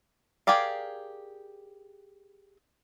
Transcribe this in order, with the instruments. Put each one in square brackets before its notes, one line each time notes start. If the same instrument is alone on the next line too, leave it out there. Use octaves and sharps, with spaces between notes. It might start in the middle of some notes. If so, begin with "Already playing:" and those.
[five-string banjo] G4 G#4 A#4 D5 F5